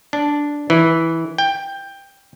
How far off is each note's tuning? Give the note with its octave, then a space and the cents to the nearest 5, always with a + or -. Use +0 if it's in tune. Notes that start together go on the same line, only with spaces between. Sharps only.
D4 -5
E3 -10
G5 +10